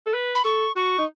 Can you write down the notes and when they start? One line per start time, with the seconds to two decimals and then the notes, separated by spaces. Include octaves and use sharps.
0.06 A4
0.14 B4
0.35 B5
0.45 A4 C#6
0.76 F#4 C#6
0.98 D#4